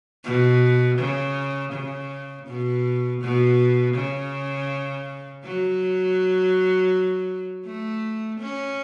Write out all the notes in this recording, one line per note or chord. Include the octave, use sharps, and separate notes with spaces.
B2
C#3
C#3
B2
B2
C#3
F#3
A3
C#4